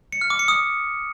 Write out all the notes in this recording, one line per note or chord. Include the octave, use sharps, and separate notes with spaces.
C#7
F6
D6
C#7
D#6